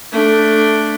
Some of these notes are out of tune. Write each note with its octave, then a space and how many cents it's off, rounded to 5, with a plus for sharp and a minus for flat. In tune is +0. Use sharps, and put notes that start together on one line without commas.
A3 +0 D4 +0